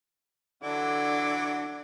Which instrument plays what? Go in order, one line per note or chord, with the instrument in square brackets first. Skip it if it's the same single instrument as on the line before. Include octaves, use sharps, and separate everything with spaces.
[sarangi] D3 [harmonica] E3 F#3 [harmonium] D4 [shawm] D6